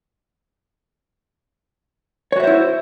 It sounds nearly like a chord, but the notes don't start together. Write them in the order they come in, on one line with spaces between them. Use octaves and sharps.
C#5 F#4 E5 C5 E4